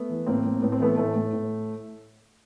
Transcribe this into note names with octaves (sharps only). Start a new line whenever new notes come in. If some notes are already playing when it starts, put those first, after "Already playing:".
Already playing: A3 B3
E3
A2 A#3 C4
A2
A2 B3
C4
E3 A3 B3
A2 A3
A2
A2